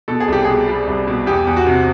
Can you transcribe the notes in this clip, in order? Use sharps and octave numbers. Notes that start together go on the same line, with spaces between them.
B2 A4
G#4
C2 G4
B2 G#4
G3
C2
B2
E2 G4
E2
F#4
C3